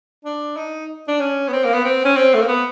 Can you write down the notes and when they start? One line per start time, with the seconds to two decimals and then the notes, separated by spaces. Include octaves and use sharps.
0.25 D4
0.57 D#4
1.08 D4
1.20 C#4
1.48 B3
1.53 C4
1.64 A#3
1.74 B3
1.85 C4
2.05 C#4
2.16 C4
2.34 A3
2.41 A#3
2.48 B3